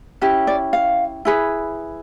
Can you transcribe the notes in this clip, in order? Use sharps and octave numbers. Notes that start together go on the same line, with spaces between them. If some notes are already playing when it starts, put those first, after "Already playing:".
C#4 E4 G4
D5
F5
E4 G#4 B4